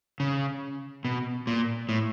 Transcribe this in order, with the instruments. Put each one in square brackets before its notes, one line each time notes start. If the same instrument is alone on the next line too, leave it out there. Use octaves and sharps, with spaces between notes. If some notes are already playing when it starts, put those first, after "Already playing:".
[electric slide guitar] C#3
B2
A#2
A2